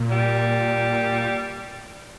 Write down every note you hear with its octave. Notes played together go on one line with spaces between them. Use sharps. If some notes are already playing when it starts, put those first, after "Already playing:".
Already playing: A#2
G3